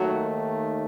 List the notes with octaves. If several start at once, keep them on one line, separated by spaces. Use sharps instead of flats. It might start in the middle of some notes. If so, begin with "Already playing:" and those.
Already playing: D#2 D#3 F#3 A3 F#4